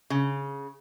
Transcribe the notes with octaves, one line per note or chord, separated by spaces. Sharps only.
C#3